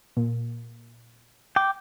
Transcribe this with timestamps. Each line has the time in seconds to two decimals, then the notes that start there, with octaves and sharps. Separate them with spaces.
0.17 A#2
1.56 G5 D6